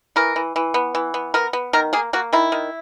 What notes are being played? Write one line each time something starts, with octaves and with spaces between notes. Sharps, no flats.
E3 A#4
E3
E3
B3
E3
B3
B3 A#4
B3
D#3 A#4
A#3 G#4
A#3 F#4
D#3 E4
D#3